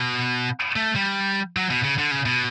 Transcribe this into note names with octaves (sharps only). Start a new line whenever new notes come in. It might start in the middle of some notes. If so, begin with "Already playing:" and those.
Already playing: B2
A3
G3
F#3
B2
C#3
D3
C#3
B2